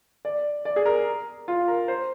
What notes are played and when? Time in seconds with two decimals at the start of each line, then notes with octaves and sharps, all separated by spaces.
0.25 D5
0.65 D5
0.76 G#4
0.86 A#4
1.48 F4
1.68 A#4
1.88 C5